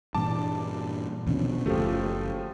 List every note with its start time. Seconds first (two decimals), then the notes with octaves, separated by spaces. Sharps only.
0.14 G2 A#2 E3 D4 A5 D6
1.26 D#2 B2 D3 F3 C#4
1.66 F#1 F3 A3 F4 G4 A4